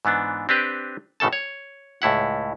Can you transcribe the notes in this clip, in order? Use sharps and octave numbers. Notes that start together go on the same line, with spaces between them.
G#2 E3 B3 D4
C4 D4 G4 B4 G5
G#1 A2 C#3 A4 A5
C#5
C#2 A2 E4 F#5